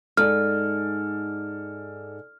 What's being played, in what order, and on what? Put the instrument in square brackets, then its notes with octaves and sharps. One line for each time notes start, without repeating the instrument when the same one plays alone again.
[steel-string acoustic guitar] G#2 [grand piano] A4 D5 [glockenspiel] F6